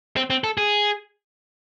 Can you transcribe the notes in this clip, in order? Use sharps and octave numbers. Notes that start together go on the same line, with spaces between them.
C4
C4
A4
G#4